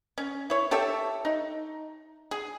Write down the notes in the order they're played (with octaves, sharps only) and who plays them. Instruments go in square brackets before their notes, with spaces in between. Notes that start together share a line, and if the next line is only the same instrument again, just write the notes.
[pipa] C#4
E4 C#5
G4 A4 C#5 E5
D#4
G#4